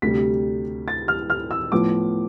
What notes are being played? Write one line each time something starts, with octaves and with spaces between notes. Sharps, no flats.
D2 C3 G3 B6
A6
F6
F6
E6
A2 F3 B3 D6